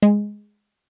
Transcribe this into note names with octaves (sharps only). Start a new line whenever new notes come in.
G#3